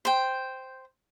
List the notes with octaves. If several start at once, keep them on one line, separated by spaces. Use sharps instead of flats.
C5 G5